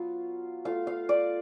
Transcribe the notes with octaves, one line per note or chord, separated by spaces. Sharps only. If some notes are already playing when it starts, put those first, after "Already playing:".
Already playing: F#3 B3 F4 F5
A3 F4 F5
F5
D5